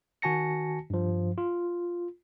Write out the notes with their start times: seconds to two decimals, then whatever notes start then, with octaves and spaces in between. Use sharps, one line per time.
0.22 D#3 F#4 G#5 A5 A#6 C#7
0.90 G2 F3
1.38 F4